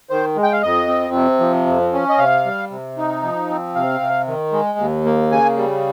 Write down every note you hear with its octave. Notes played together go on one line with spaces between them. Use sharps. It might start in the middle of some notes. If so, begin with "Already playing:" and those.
D#3 C5
G#3
G5
F5
F2 D#5
C4
C3
F3
F2
C#4
D#5
C3 F5
G3
C3
D#4
F3
C4
C3 F5
C3
D#3
G#3
D#2
A#3
C#3 G#5
G3